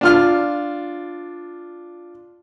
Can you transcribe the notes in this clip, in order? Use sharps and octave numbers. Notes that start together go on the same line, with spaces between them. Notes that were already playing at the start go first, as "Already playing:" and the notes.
D4 F4 F6